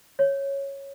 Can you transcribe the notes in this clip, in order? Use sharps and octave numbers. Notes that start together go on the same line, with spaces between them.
C#5